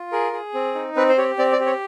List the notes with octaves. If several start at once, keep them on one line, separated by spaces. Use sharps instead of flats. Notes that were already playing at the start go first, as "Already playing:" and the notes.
Already playing: F4
G#4 A#4
G#4
C4
D#4
C4 B4
C5
G4 C#5
C4 D5
D5
G4
C#5